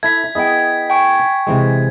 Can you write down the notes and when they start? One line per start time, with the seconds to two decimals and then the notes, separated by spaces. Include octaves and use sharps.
0.03 E4 A4 E5 G#6 B6
0.35 B3 E4 G#4 D#5 G5
0.90 G5 G#5 C#6
1.47 C3 E3 G#3